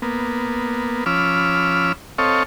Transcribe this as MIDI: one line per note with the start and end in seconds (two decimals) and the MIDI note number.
0.02 1.04 58
0.02 1.04 59
1.06 1.92 53
1.06 1.92 61
1.06 1.92 83
1.06 1.92 86
1.06 1.92 88
1.06 1.92 89
2.18 2.43 60
2.18 2.43 69
2.18 2.43 73
2.18 2.43 75
2.18 2.43 77
2.18 2.43 85